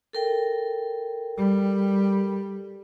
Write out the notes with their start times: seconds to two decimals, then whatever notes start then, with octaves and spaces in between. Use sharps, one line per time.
0.13 A4 A#4 G5
1.37 G3